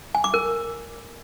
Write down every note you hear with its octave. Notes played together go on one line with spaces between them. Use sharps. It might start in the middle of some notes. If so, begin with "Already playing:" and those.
G#5
D6
A#4